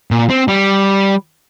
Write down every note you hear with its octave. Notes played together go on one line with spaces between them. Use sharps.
A#2
C4
G3